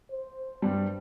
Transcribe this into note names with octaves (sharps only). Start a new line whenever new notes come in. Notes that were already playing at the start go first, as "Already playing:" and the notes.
C5
G2 G3